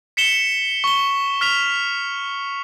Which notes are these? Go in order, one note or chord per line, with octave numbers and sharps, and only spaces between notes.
B6 C#7 E7 G7
C#6 G7
F6 B6 F7